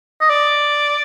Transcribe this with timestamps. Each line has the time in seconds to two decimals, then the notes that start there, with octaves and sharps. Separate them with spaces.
0.21 D#5
0.29 D5